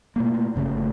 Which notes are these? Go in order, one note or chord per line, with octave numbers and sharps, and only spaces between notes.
B2 A3 A#3
G1 C#3 A3